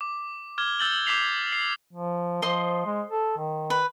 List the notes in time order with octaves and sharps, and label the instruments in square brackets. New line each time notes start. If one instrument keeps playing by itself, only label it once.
[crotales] D6
D6 F6 G#6 G7
E6 G6 A6 F#7 G7
D6 G6 B6 C7 F7
C7
[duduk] F3
[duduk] F3 [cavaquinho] C5 D#5 C6
[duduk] G#3
A4
D#3
[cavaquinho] B4